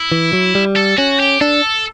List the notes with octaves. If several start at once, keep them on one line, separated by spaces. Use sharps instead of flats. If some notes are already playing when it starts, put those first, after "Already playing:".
Already playing: E4
E3
F#3
G3
A4
C#4 F#4
G4
D4 A4